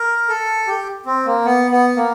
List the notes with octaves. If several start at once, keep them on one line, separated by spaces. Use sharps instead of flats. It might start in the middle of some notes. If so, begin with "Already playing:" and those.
Already playing: A#4
A4
G4
C4
A#3
B3
B3
A#3